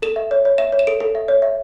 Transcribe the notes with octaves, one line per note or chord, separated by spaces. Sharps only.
A4 E7
E5
C#5
C#5
E5 E7
C#5
E7
A4 D7
A4
E5
C#5
E5